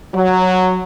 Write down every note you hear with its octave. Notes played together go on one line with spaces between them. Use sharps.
F#3